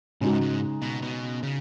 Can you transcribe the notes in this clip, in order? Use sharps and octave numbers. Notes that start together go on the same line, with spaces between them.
G#2 C#3 G#3 D#4 F#4
G#2
B2
B2
C#3